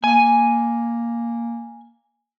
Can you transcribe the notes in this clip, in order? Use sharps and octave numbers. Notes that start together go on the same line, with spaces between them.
A#3 G#5